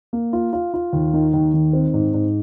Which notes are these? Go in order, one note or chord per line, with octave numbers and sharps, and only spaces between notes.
A#3
F4
F4
F4
D#2
D#3
D#2
D#3
C4
G#2
G#2